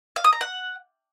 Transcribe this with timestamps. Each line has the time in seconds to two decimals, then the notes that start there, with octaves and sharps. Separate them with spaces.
0.16 F5
0.24 D#6
0.33 A#5
0.41 F#5